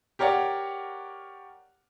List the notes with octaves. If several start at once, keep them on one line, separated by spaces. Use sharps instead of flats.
G4 A#4 C#5 D5 F#5